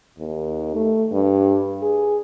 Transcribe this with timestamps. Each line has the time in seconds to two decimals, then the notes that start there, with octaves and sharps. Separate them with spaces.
0.18 D#2
0.75 A3
1.12 G2
1.82 G#4